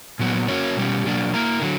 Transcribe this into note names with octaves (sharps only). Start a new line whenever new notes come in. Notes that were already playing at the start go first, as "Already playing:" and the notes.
A#2 F#3 B3
A#3 C#4 F#4 A#4 C#5
B2 G3 C#4 G4
B2 F#3 A#3 D4
A#3 E4 A#4
D3 F#3